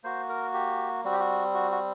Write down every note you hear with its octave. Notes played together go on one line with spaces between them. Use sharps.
A#3 F#4 C5
A#4
G4
G3 C4 F#4
G4
F#4
F#4
F#4